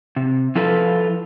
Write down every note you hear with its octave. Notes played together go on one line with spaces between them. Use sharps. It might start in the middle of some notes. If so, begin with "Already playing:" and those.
C3
F3 E4 F4 A4 B4